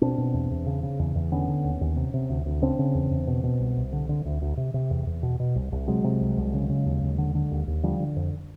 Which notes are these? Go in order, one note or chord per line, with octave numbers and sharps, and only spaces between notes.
B2 C4 D4
B2
E2
E2
C#3
C#3
E2
E2
D3 B3 C#4
D3
D#2
D#2
C3
C3
D2
D2
C#3 C4 D4
C#3
E2
E2
B2
B2
C2
C2
D3
D3
D2
D2
C3
C3
E2
E2
B2
B2
C2
C2
C3 F#3 G#3
C3
C2
C2
C#3
C#3
D#2
D#2
D3
D3
D#2
D#2
D3 F3 G3
D3
F2